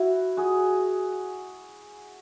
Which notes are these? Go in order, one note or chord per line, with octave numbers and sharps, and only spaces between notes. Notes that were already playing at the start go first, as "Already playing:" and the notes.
Already playing: E4 F#4
F#4 G#4